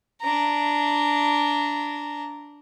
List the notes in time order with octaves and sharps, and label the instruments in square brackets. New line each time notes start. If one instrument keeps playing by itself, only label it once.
[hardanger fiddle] D4 A#5